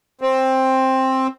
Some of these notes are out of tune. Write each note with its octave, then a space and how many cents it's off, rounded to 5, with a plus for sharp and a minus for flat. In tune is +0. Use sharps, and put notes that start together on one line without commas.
C4 +10